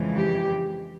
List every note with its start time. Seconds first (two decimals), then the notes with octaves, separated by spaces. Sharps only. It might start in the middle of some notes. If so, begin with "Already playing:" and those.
Already playing: F2 C#3 E3 G#3
0.17 G4